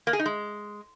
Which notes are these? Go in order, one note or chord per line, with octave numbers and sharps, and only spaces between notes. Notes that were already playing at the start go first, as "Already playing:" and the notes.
A#3
G#4
D#4
G#3